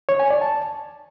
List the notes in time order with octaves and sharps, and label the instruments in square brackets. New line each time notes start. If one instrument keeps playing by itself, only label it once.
[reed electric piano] C#5
G#5
D5
A5